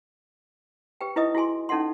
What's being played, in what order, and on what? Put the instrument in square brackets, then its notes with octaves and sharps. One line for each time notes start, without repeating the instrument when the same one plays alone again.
[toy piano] G4 B4 G5
D#4 E4 B4 D#5 E5 D#6
E4 F#4 G#4 G#5 C6
C#4 D#4 A4 E5 F#5 C6